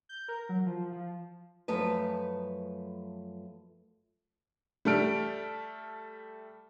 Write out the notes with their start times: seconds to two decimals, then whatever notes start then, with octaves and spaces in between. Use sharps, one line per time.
0.09 G6
0.28 A#4
0.49 F#3
0.66 F3
0.92 F3
1.68 F#2 F3 A3 B4
4.85 G3 A3 A4 F6 D7